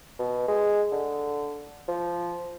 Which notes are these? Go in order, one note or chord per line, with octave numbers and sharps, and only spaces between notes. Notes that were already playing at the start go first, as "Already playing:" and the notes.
B2
G#3
D3
F3